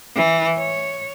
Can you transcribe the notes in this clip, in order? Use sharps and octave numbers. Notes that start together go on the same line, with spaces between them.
E3
C#5